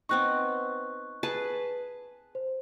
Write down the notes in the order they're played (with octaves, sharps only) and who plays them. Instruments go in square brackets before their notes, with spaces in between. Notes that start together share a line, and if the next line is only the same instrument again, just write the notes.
[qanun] B3 C4 D#4 [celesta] C#6 F#6
[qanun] G#4 B4 A5
[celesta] C5